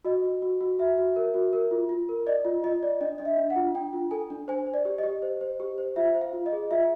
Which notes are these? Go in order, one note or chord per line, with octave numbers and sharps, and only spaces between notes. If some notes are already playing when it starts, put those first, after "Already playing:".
F#4 D#5
F#4
F#4
F#4
F#4 E5
F#4
A#4
F#4
A#4
F4
F4
A#4
D5 D#5
F4
F4 D#5
D5
D4 D#5
D4 D#5
E5
D4
F#5
F4
D4 G5
F4
A4 G#5
D4
C5 G#5
C5
D5
G4
G4 D#5
C5
C5
G4
C5
F4 E5
C5
F5
F4
D#5
G#4
F4 E5